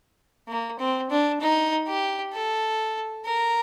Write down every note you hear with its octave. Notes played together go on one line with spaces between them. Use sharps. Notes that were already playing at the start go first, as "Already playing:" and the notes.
A#3
C4
D4
D#4
G4
A4
A#4